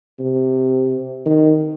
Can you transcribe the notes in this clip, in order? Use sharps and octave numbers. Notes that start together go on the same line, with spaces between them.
C3
D#3